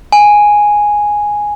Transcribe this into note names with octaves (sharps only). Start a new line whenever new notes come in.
G#5